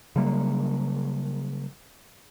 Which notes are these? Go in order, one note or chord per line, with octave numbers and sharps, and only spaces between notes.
C#3 F#3 G3 A#3